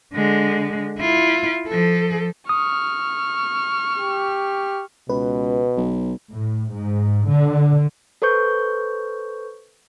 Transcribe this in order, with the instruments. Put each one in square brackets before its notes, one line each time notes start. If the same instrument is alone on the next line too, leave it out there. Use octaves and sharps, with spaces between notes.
[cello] D3 G#3
E4 F4
F3 A4
[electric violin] C#6 F6 [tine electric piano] D#6
[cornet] G4
[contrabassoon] C#2 [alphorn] B2 [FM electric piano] B4
[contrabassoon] B1
[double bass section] A2
G#2
D3
[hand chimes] A4 B4 C5 C#6 G6